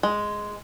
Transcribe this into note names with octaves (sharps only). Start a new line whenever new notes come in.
G#3